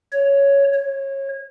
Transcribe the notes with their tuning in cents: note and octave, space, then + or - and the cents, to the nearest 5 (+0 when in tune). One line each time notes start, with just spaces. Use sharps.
C#5 +5
C#5 -25